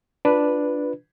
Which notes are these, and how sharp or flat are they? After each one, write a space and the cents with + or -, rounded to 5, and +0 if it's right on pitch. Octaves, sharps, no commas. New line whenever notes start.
D4 +0 F4 +0 B4 +0